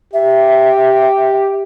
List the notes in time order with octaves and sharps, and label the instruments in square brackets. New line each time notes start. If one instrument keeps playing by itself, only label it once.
[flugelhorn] G4 [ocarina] E5